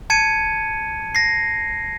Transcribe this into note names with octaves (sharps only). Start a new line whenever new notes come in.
A5 G#6 C#7 D#7
A#6 C7